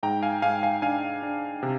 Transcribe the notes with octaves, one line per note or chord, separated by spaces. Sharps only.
G#2 G5 A#5
F5 G#5
G#2 F5 G#5
F5 G#5
D4 F5 G#5
D4
C3